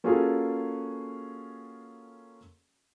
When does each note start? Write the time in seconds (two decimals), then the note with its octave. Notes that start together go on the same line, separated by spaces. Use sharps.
0.04 A#3 C#4 F4 F#4 G#4 A4